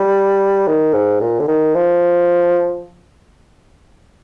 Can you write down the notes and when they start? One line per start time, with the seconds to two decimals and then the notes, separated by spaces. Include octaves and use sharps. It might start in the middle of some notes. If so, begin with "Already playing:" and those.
Already playing: G3
0.68 D#3
0.94 G#2
1.21 A#2
1.40 D3
1.48 D#3
1.75 F3